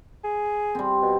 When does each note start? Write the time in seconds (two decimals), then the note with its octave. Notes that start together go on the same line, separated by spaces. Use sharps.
0.24 G#4
0.75 G3 C4
1.02 B2